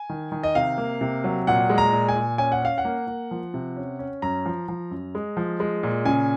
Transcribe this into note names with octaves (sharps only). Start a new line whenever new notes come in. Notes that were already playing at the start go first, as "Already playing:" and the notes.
Already playing: G#5
D#3
D#3
D#5
C3 F5
A#3
C3
F#3
A#2 F#5
G#3
A#5
A#2
G#5
A#2
C#4 G#5
F#5
C#4 F5
F#5
A#3
A#3
F3
C3
C#4
C#4
F#2 A#5
F3
F3
F#2
G#3
F3
G#3
A#2
C#3 G#5